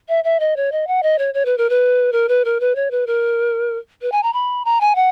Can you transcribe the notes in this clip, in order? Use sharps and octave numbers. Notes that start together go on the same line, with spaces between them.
E5
E5
D#5
C#5
D#5
F#5
D#5
C#5
C#5
B4
A#4
B4
A#4
B4
A#4
B4
C#5
B4
A#4
B4
G#5
A#5
B5
A#5
G#5
F#5